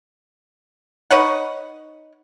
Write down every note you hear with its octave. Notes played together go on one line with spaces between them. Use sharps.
D#4 B4 C#5 F#5